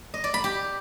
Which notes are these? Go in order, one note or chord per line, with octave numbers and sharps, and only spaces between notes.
D#5
D5
B5
G4